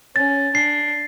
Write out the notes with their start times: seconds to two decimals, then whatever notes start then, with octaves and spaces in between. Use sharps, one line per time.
0.16 C#4 A6
0.54 D4 C7